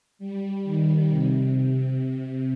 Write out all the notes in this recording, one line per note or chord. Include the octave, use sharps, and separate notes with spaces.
G3
D#3
C3
C3
C3